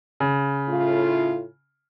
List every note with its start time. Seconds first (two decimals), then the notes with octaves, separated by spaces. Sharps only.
0.20 C#3
0.68 A2 F4